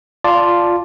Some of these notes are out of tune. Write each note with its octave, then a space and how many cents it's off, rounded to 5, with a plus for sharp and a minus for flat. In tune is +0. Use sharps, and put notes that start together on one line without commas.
F4 +0 D5 +0 A5 +0